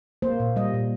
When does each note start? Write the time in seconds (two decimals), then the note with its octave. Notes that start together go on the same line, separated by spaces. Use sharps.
0.22 A#3 C5
0.40 A#2
0.56 G3 D#5
0.74 A#2